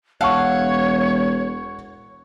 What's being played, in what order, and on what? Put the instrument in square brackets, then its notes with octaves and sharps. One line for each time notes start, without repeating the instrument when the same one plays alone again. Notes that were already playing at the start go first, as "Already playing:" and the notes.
[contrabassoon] E1 [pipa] A4 F5 [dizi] C#5 [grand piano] F#5 C#6